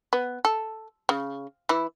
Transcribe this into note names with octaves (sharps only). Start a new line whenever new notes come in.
B3
A4
C#3
E3 E4